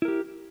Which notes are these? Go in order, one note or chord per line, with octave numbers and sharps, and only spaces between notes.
E4 G4 A#4